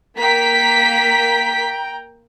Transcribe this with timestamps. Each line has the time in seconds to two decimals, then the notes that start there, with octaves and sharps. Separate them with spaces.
0.17 A#3 G5 A#5 B6